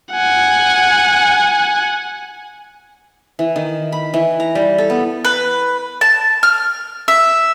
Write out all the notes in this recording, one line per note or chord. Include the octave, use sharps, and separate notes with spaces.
F#5 G#5
E3
D#3
B5
E3
A#5
G3
A4
B3
B4
A5
F6
E5